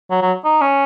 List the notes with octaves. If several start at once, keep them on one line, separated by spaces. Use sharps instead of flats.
F#3
F#3
D#4
C#4